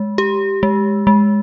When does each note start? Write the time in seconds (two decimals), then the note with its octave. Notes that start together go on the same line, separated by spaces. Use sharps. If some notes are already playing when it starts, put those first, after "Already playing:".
Already playing: G#3
0.18 G4
0.63 G#3
1.07 G#3